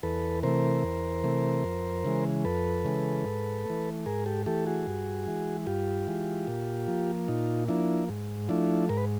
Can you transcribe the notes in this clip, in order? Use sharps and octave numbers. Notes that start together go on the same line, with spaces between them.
E2 A4 B4
C3 E3 A3 A#4 C5
E2
C3 E3 A3
F2
C#3 E3 G#3
F2 A4 B4
C#3 E3 G#3
G#2
E3 A3
G#2 G#4 A#4
G4 A4
E3 A3 G4 A4
F#4 G#4
G2
E3 G#3
G2 F4 G4
E3 G#3
A#2
F3 A#3
A#2 D#4 F4
F3 A#3 D4 E4
G#2
F3 A3 D4 E4
G#2 A#4
B4